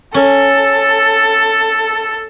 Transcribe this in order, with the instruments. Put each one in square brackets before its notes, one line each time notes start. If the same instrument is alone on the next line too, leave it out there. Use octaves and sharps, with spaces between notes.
[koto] C#4 [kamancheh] A4